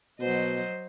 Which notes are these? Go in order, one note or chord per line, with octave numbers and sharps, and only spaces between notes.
B2 F#3 C5 D#5